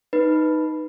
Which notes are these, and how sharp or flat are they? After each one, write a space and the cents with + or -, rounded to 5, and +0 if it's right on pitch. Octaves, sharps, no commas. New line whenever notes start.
D#4 +0 B4 +0